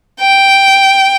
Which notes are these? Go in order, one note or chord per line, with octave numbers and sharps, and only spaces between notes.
G5